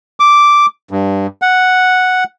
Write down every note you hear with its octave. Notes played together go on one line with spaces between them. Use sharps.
D6
G2
F#5